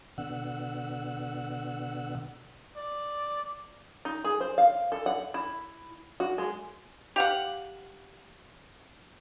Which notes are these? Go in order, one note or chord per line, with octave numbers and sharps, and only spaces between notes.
B2 D3 F#5 E6
D5
D#4
G#4
C5
F5
A4
F#5
E4
F#4
G#3
G4 F5 F#5